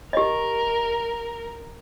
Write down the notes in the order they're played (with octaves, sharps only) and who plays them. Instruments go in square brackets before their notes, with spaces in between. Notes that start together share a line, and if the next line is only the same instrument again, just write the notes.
[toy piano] G4 D#5 [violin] A#4